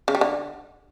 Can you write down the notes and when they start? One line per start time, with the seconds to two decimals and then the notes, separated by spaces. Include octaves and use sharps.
0.08 C#3
0.15 G3
0.21 D3